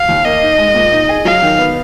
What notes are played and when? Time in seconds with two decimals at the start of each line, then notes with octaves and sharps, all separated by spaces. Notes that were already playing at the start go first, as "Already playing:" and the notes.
Already playing: F5
0.09 D#2
0.25 A#3 D#5
0.42 D#4
0.58 G#3
0.75 A#2
0.92 D#4
1.09 G#4
1.25 F#3 F5
1.42 D#3
1.59 B3